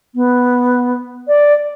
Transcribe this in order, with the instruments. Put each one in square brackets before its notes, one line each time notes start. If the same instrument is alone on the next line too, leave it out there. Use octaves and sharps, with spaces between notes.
[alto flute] B3
D5